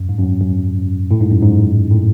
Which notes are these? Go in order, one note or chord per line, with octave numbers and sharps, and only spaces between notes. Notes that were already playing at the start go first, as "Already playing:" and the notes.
Already playing: F#2
G#2
F#2
F#2
A2
G#2
F#2
G#2
A2